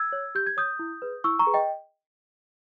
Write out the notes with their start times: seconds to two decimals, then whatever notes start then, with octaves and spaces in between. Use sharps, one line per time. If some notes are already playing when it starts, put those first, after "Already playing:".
Already playing: E6 G#6
0.12 C#5
0.35 G4 G6
0.47 G#6
0.57 C#5 D#6 G6
0.79 E4
1.02 G#4 B4
1.24 E4 C#6 E6
1.39 A#5 C#6
1.46 G#4 B4
1.54 D#5 G5